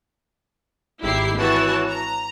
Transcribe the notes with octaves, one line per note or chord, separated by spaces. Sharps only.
G#1 E4 G4 E5 C7
E3 F#4 C#5 A5
A#5